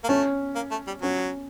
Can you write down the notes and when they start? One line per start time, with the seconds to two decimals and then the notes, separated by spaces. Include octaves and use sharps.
0.04 A#3
0.09 A3 C#4
0.56 A#3
0.71 A3
0.87 G3
1.02 F#3 C#4